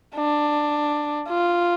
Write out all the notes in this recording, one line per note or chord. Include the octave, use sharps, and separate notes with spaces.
D4
F4